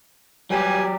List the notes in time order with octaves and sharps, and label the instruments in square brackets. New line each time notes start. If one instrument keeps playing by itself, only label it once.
[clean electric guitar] F#3 G4 [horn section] G3 B4 G#5